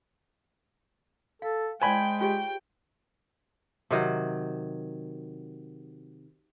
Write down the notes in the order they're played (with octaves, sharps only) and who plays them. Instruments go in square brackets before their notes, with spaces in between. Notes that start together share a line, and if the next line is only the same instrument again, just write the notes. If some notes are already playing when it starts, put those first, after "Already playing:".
[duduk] A4 [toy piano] F5
[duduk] G#3 [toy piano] C5 D5 [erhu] G5 [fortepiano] G#5 B5
[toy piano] F4 G4 G#4 [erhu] G5
[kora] C3 D#3 F#3